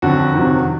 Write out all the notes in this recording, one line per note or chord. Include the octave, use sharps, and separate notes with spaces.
F2 D3 F#3 F#4
F2 C3 D#3 F#3